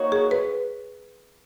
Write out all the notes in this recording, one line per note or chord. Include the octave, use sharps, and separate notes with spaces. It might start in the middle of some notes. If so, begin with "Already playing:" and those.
Already playing: A#3 D#4 F#4 C#5
G#4
B4